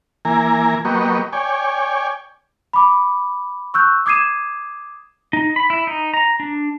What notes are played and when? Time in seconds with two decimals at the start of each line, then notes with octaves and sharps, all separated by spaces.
0.25 E3 A#3 G#5 A#5
0.85 F#3 A#3 B3 G4 D#5 C#6
1.33 C#5 D5 G5 G#5
2.73 B5 D6
3.74 C#6 E6 F#6 G6
4.06 D6 D#6 G#6 C7 D#7 E7
5.33 D#4
5.56 B5
5.70 E4
5.87 D#4
6.14 A#5
6.40 D4